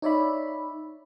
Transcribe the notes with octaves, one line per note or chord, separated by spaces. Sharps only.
D#4 C#5 D5 E5 B5